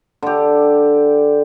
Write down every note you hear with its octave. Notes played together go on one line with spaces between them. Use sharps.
D3 G4